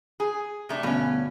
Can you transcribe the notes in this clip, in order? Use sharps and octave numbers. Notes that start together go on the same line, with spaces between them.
G#4
C3 A3 D4
D2 G2 B2 C#4